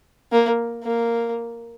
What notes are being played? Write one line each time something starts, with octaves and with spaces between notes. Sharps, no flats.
A#3
A#3